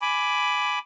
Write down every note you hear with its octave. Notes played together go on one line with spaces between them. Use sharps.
G#5 B5 D6